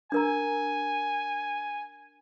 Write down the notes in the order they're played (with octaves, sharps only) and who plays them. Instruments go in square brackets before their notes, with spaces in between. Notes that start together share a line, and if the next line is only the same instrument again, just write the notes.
[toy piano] D4 A#4 A#5 [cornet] G#5